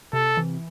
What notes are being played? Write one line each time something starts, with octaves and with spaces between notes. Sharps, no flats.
C3 A4
E3